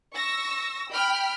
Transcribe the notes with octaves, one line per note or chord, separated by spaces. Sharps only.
C#6 E6 A#6
G5 B5 F6